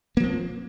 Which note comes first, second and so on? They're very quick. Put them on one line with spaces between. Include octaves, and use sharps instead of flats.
A#3 F3 C4